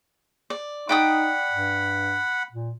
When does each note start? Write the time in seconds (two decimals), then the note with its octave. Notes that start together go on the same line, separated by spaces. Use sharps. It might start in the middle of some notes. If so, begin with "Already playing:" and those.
0.50 D5
0.89 D#4 D5 F#5 G5 B5 D#6
1.52 G2
2.52 A#2